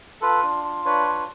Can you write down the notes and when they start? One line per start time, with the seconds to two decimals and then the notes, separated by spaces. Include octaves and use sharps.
0.21 F4 A4 B4
0.43 D4
0.64 F4
0.85 D4 B4 C#5
1.07 F4